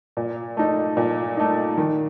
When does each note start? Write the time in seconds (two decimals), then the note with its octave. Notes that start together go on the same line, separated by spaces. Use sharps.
0.17 A#2
0.57 A3 D#4
0.97 A#2
1.37 A3 D#4
1.78 D#3